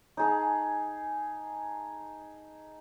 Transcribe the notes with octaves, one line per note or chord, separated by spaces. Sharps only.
D#4 G#4 A5